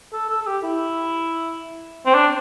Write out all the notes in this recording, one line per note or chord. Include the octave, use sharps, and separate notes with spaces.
A4
A4
A4
G4
E4
C4
D4